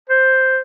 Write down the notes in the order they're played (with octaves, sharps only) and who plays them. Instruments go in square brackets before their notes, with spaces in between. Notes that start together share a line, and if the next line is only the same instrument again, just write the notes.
[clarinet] C5